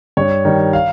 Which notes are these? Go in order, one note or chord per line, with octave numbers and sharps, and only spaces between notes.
G2 C#5
D#3 G3
F5